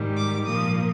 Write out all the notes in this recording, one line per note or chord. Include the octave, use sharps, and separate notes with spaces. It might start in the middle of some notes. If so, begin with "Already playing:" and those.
Already playing: G#2 D#3 G3
D6
A#2 F3 A#3 D#6